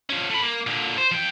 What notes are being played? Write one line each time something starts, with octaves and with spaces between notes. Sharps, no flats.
F3 C#4
A3 B5
A#3
A#2 D3
C5
F3 G5